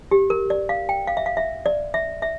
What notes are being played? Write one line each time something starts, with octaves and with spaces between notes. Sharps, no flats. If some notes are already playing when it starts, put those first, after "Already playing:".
G4
A#4
D5
F5
G5
F5
E5
F5
E5
D5
E5
E5